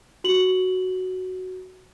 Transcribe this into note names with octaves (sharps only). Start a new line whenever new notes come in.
F#4 F#7